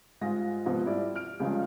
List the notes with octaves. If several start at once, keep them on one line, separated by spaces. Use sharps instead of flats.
G#2 G3 G#3 F4 A#6
G#2 C3 F3 B3
G3 E4 D5
F6 D7
C#2 C#3 F3 G3 G#3